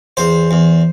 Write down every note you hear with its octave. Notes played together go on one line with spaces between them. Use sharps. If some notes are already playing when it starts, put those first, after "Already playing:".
E2 C5
E2